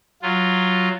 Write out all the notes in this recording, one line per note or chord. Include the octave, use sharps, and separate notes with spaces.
F#3 F4